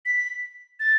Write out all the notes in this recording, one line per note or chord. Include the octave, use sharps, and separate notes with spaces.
B6
A6